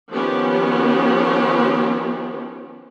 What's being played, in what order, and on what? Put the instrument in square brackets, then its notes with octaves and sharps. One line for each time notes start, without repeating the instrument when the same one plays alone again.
[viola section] D#3 F3 B3 C#4 G4